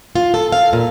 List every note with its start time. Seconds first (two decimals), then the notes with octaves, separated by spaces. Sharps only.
0.15 F4
0.34 A4
0.52 F5
0.73 A#2